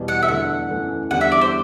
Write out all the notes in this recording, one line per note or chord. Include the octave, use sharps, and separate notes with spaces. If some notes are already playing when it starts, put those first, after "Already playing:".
Already playing: E2 B2 G3 B3
F#5
E5
E2 D3 A3 F#5
F#2 E3 A3
E2 D3 G3 B3 F#5
E5
D5
C5